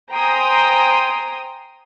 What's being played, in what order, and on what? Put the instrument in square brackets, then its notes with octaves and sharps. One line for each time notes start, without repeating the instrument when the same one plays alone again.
[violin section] C5 G5 G#5 A#5 C6 D#6